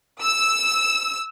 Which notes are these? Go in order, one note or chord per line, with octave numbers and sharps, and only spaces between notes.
E6